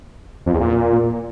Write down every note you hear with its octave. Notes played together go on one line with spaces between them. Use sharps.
F2
E2
A#2